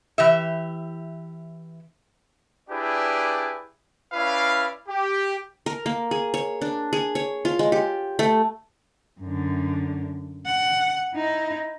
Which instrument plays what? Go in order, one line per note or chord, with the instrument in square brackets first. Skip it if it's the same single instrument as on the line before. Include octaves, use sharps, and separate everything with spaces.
[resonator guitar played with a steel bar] E3 G4 E5
[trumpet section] D4 E4 G4 G#4 B4 D5
C#4 E4 B4 D5 F5
G4
[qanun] A#4
A#3
G#4
C#5
D4
G#4
C#5
F4
G#3
G4
A3
[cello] F#2 D3
F#5
D#4 E4